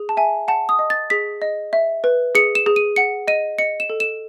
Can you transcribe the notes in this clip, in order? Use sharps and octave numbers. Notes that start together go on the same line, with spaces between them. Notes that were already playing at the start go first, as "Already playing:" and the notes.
Already playing: G#4
A5
E5 G#5
F#5 A5
D#6
D#5
A6
G#4 B6
D#5
E5
B4
G#4 C#7
E7
G#4
D#7
F#5 C#7
D#5 D#7
D#5 C#7
E7
A4
E7